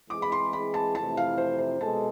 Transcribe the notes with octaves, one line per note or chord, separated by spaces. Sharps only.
E3 G#3 C4 G#4 D6
B5
C6
B5
A5
F2 C3 E3 A3 E4 A5
F5
C5
C5
B2 G#3 A4 A5